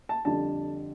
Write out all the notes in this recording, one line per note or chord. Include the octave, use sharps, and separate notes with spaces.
A5
F2 D3 G3 D4 A5